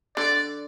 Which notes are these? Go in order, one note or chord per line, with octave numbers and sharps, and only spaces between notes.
D3 D5